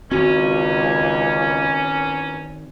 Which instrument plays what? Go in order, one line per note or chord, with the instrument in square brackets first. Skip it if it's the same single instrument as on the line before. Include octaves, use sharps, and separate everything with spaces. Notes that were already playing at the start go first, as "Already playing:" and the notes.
[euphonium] C#2 [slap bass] D#3 C4 [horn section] E3 A#3 C#4 [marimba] F#4